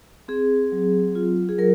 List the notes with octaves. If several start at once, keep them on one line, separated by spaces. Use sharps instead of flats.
C4 G#4
F#3
F4
G#4
F#3 A#4